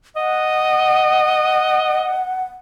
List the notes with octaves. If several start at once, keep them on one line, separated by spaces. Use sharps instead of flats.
D#5 F#5